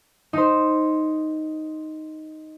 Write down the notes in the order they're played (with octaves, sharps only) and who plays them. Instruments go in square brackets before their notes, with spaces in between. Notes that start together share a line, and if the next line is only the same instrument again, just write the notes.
[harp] D#4 C5